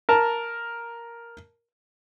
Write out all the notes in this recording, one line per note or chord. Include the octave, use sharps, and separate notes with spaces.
A#4 A5